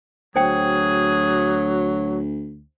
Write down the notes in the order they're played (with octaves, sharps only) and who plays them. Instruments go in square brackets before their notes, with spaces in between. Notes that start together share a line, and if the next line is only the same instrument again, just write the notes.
[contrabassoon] D2 [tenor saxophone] F#3 [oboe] G#4 [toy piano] C5 G5